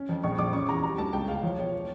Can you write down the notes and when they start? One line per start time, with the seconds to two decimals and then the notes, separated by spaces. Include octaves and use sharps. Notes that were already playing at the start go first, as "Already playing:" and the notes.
Already playing: C#4
0.09 F2
0.24 A#1 C#6
0.38 A#1 D6
0.53 C#4 C#6
0.68 E2 A#5
0.83 G3 A#5
0.98 D2 A5
1.13 C#2 G5
1.28 C#2 F5
1.43 F3 C#5
1.58 E1 C#5
1.73 C#5